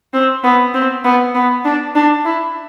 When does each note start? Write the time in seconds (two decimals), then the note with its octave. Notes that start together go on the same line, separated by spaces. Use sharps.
0.13 C4
0.44 B3
0.74 C4
1.04 B3
1.35 B3
1.65 D4
1.95 D4
2.25 E4